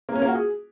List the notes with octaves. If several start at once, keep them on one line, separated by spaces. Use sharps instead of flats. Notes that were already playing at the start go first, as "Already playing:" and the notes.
A#3
C#4
A#3
F#4
G#4